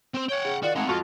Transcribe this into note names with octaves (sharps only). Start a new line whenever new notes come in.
C4 C5
C#5 F#5 G5
C#3
D#3 F4 F#4 D5
G#3 A3 C4 D#4 F#5
F2 F4 F#4